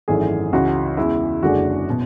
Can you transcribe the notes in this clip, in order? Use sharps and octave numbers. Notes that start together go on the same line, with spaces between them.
G#1 F#2 E3 A3 D4 G#4
C#2 C#3 E3 F#4
E2 C#3 G#3 E4
F#1 F#2 D3 G#3 D4 F#4
B2